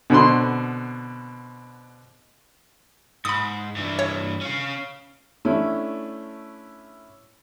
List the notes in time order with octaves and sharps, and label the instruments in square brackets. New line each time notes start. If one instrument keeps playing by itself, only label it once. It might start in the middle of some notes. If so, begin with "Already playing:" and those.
[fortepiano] B2 D3 C4 B5 C6
[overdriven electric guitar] G#2 [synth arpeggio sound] B5 D#6
[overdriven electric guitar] G2 E3
[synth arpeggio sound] C#5
[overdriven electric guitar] C#4 F5
[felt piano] A3 C#4 D4 E4